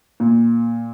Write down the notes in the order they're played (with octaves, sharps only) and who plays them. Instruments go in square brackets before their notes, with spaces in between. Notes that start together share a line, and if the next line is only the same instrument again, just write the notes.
[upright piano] A#2